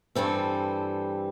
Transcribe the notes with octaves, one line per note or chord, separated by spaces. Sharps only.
G2 E3 G3 C4 A4